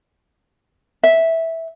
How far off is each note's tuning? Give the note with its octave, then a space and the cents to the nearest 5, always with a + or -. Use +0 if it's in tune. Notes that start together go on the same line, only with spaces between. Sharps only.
E5 -10